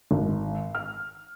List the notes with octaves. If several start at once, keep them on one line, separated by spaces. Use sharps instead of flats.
G#1
F6